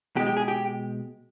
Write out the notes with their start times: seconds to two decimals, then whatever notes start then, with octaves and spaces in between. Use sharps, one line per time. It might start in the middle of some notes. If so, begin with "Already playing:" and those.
0.16 B2 G4
0.20 G#3
0.27 G4
0.37 G#4
0.48 G4